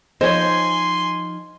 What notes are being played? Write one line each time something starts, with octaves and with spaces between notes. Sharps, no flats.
F3 D#4 C5 C#5 D#5 G#5 C6